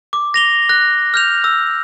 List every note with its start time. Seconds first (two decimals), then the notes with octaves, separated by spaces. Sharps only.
0.13 D6
0.34 A#6 F7 G7
0.69 F#6 A#6
1.14 F6 G6 F7
1.44 E6